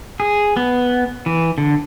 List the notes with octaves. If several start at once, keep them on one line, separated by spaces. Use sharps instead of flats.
G#4
B3
E3
D3